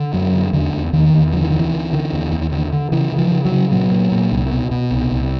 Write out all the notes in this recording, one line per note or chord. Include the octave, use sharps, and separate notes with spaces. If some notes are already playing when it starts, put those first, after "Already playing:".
Already playing: D3
F#2 F#3
D3
E2 D3
E2
E2 D#3
E2
D3 F3
E3
D2 D#3
E3
D3
D3
D#2
D#2
D3
D3
C#3 E3
C#3
F3
C#3
F#3
C#3
A#2 F#3
A#2
A#2
C2
B2
B2
C2
C2